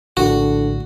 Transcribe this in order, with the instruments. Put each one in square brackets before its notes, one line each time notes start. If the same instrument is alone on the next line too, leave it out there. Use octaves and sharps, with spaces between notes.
[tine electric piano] A#1 A2 [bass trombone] D3 [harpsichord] F#4